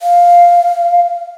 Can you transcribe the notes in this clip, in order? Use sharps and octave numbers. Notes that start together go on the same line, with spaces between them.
F5